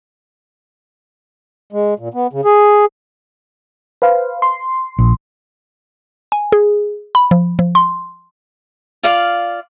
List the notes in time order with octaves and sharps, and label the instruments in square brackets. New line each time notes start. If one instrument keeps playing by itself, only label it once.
[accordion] G#3
A#2
B3
C#3
G#4
[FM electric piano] B4 C5 F5
C6
[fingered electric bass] A#1
[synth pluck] G#5
G#4
B5
F3
F3
C6
[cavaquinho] F4 D5 F5